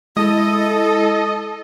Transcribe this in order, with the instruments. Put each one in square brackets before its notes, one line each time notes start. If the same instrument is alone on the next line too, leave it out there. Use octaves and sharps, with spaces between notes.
[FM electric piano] G#3 [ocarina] E4 [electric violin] A4 [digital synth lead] D#5